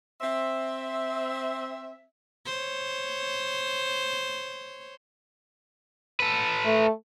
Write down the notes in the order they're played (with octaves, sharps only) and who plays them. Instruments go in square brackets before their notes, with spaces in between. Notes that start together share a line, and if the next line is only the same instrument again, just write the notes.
[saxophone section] C4 E5
[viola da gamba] C5 C#5
[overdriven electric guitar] A4 B4
[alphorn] A3